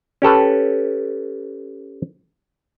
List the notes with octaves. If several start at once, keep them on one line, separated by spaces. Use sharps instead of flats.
C#4 G4 A4 B4